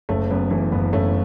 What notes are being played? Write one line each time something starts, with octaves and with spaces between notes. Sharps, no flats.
F#1 A3 C#4
F#2 B3
E3 A3
F#1 B3
F#1 A3 C#4